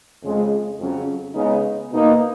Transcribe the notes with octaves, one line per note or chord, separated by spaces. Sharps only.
F2 C#3 G#3
F2 C#3 F#3 C#4
C#3 G#3 B3 D#4
B2 A#3 D#4